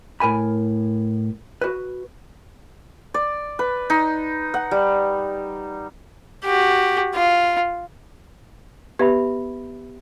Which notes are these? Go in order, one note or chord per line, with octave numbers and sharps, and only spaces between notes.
A2 A#4 G#5 B5
F#4 B4
D5
B4
D#4
F#5
G3
F#4 G4
F4
B3 G4 B4 E5 B5 G#6